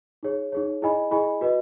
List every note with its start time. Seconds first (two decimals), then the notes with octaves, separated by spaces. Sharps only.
0.23 D#4 G#4 C#5
0.52 D#4 G#4 C#5
0.82 E4 G#4 D#5 G#5 B5
1.11 E4 G#4 D#5 G#5 B5
1.41 F#4 B4 D#5